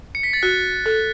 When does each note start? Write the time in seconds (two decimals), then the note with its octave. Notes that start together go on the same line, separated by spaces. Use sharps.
0.15 C#7
0.23 B6
0.33 A6
0.43 F#4 F#6
0.86 A4